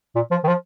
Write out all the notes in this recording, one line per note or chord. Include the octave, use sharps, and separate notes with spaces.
A#2
F3
D#3
F3